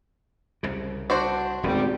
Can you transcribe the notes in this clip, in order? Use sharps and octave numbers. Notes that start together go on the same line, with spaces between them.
C2 C#3
D4 F#4 C5
D#1 G#1 D2 C#3 G3